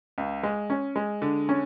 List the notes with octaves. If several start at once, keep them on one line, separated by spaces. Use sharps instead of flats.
C#2
G#3
C#4
G#3
D3
C#4